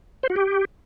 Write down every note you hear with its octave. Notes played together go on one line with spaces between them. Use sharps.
C5
F#4
G4